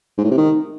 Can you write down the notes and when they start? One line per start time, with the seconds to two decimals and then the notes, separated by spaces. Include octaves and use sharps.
0.18 G#2
0.24 A2
0.31 C3
0.38 D#3